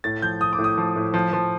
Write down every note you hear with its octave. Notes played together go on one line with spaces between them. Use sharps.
A2 A6
F3 G6
F3 D#6
D6
A2
D#6
F3
A2
F3
F3